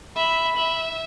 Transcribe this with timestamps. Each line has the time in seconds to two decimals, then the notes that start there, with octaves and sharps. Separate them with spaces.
0.16 E5 B5
0.57 E5